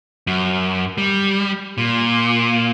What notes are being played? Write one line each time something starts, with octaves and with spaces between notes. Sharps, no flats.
F#2
G3
A#2